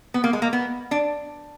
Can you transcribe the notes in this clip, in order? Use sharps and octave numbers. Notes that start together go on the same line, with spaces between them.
B3
A#3
G#3
A#3
B3
D4